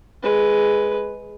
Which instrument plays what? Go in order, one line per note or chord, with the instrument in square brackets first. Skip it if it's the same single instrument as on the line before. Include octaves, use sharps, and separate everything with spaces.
[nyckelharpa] G#3 B4